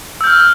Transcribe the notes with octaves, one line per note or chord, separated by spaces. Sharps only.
E6 F6 G6